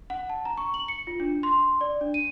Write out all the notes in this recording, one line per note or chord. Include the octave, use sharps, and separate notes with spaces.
F#5
A5
A#5
C#6
F#7
C#7
F4
D4
C6
D5
D4
D#7